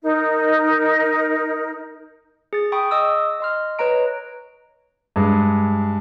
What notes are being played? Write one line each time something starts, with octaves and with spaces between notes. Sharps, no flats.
D#4 A#4
G#4 A6
G5 B5 C#6 D#6
D#5 D#6 E6
D#5 C6 F6
B4 C#5 D#5 A#5 D7
G2 G#3